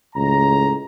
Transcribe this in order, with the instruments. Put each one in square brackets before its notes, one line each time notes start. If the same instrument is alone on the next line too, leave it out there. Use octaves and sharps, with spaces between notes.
[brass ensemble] C#2 A2 A#5